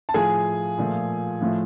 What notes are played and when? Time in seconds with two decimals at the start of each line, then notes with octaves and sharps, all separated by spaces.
0.09 A5
0.14 A2 F3 A3 G#4 G#5
0.78 A#2 F3 A3
1.41 A2 F3 A3